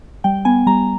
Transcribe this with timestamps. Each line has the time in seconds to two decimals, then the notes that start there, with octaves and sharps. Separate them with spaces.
0.24 G3 G5
0.45 B3 G#5
0.67 G3 A#5